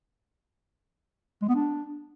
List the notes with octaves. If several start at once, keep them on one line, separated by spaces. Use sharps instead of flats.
G#3
B3
D4